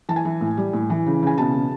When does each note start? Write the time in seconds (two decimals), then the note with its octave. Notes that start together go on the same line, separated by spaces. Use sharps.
0.09 E3 A5
0.16 G#5
0.25 E3
0.41 A2
0.57 G3
0.73 A2
0.90 E3
1.06 C#3
1.23 C#3 G#5
1.38 B2 A5
1.55 B2